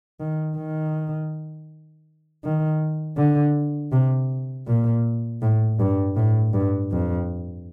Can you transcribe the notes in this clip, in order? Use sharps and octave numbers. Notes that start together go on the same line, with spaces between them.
D#3
D#3
D#3
D3
C3
A#2
A2
G2
A2
G2
F2